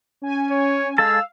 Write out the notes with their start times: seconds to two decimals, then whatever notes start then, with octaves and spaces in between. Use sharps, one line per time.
0.22 C#4 G#5
0.51 C#5
0.98 G#3 A4 F5 A5 E6